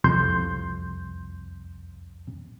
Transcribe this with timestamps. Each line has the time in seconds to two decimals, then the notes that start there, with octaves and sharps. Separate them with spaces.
0.04 C2 F2 C6 G6